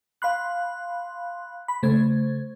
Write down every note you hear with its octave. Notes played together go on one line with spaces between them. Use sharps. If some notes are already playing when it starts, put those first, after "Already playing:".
F5 B5 C6 F#6
B5
C#3 A3 C5 G#6